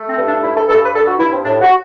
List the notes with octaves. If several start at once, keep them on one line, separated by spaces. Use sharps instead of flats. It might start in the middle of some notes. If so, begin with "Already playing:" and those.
Already playing: A3
C4
G2
D4
G2 E4
A4
G2 A4
B4
G2 A4
F#4
G2 E4
C4
A2 D4
F#4